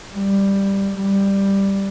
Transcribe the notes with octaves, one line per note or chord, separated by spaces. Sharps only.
G3
G3